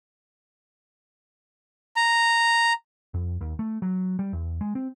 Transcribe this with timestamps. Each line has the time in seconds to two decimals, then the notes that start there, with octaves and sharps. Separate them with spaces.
1.96 A#5
3.14 F2
3.41 D#2
3.59 A3
3.82 F#3
4.19 G3
4.33 E2
4.61 G#3
4.75 C4